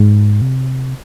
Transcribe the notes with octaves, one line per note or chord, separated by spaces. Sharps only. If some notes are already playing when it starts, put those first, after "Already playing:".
Already playing: G#2
C3